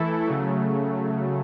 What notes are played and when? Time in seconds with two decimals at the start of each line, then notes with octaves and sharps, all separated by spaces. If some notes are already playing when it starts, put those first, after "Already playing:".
Already playing: E3 A3 E4 A4
0.26 C#3 F#3 A3